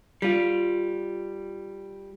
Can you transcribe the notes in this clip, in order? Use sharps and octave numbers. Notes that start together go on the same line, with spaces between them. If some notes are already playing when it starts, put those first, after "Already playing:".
G3 F4